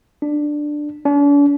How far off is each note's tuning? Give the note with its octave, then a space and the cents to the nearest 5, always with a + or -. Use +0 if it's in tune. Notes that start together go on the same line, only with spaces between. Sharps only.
D4 +10
D4 -45